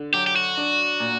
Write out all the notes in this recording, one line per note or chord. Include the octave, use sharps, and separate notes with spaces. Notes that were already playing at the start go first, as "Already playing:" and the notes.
Already playing: D3
F#3 G4
G4
F#4
D4
A#2